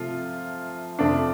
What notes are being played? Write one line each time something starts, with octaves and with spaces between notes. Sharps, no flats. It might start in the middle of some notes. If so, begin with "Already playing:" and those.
Already playing: C3 F3 A3 F4
F2 C3 A3 D4